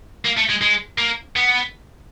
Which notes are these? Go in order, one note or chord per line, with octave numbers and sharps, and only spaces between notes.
A#3
A3
G#3
G#3
A#3
B3